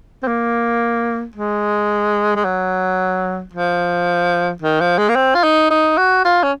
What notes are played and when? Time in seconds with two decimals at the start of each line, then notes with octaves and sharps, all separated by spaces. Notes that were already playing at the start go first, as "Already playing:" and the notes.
0.23 C4
0.27 A#3
1.36 G#3
2.36 G#3
2.45 F#3
3.53 F3
4.62 D#3
4.80 F3
4.98 G#3
5.09 A#3
5.16 C4
5.35 F4
5.44 D#4
5.70 D#4
5.98 F#4
6.25 F4
6.43 C#4